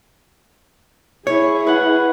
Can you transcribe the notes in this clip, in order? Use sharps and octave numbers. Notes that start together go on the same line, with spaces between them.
E4 G#4 C#5
B4 F#5